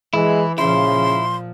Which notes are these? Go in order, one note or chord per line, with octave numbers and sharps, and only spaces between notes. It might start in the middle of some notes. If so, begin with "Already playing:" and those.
E3 G#3 E4
A#2 C#3 F3 E4 C6